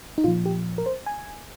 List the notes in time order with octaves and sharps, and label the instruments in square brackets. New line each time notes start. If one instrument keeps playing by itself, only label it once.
[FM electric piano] D#4
A#2 F3 F4
G4
A#4
C5
G#5